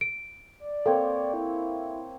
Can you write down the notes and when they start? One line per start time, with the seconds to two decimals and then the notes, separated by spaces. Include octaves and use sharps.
0.01 D7
0.60 D5
0.86 A#3 C4 A4 C#5
1.34 E4